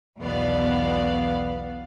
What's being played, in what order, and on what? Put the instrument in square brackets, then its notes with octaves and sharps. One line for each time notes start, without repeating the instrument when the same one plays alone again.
[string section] B1 E2 B2 B3 D5 F5